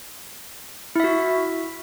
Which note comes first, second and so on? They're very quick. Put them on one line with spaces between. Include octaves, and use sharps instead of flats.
E4 E5 F#4